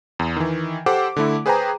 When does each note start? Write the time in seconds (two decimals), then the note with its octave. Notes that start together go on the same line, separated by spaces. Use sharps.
0.19 E2
0.36 D#3 E3
0.86 G4 A4 C5 F#5 D6
1.16 D3 A3 E4
1.46 G#4 B4 C5 G5 G#5 A#5